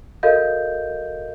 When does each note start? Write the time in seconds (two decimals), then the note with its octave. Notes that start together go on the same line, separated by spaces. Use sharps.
0.23 F#4 A4 A#4 D#5 F5 G6